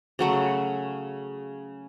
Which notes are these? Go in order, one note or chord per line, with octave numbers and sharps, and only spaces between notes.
C#3 F#3 A3 F#5